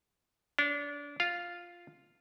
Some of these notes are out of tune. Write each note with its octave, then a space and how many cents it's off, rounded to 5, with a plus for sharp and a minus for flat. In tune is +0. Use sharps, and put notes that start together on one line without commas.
D4 -25 C#5 +0
F4 +0 F5 +0